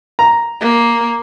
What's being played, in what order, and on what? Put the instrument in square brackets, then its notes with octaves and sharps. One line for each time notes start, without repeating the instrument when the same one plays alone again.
[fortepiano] A#5
[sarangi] A#3